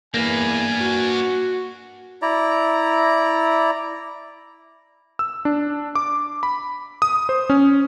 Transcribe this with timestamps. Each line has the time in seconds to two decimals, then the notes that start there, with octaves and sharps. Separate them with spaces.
0.14 E2 A#3 D4 B4 G#5
0.81 F#4
2.22 E4 D5 A#5
5.19 E6
5.45 D4
5.95 D6
6.43 B5
7.02 D#6
7.29 C5
7.50 C#4